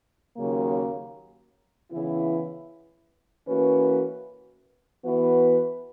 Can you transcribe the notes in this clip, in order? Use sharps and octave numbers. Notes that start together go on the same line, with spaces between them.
D#2 C#3 F#3 A#3
C#3 E3 B3 E4
E3 A#3 C#4 F#4 B4
E3 B3 F#4 B4